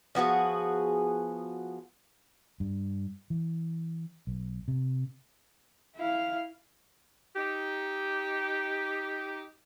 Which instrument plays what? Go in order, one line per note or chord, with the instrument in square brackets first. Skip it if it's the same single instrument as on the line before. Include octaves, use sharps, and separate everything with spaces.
[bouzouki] F3 B3 F#4 G#4
[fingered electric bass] G2
E3
B1
C3
[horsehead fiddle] E4 F5
[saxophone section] D#4 G4